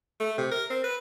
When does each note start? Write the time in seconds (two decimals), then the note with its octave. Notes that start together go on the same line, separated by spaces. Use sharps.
0.20 A3
0.38 C3
0.51 A#4
0.70 C4
0.84 B4